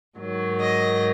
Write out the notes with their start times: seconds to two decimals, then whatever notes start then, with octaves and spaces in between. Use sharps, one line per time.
0.16 G#2 D#3 F#3
0.60 D#5